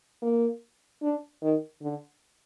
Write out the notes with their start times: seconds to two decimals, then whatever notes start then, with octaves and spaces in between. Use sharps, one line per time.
0.22 A#3
1.03 D4
1.42 D#3
1.82 D3